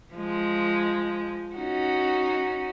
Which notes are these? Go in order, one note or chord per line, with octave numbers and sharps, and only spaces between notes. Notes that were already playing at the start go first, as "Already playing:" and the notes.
F3 G#3
C#4 D#4 F#4